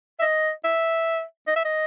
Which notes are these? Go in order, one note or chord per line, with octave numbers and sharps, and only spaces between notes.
E5
D#5
E5
D#5
E5
D#5